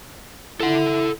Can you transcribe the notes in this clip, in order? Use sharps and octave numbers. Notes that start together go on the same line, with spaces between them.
E4 A4 F#5